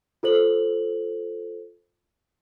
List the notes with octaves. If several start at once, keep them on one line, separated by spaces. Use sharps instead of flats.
F4 A4 C5 F#7